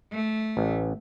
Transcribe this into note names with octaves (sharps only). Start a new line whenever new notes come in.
A3
A1